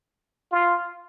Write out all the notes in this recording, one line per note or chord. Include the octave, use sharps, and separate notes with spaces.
F4